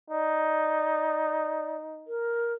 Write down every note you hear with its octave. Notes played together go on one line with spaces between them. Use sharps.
D#4 D5
A#4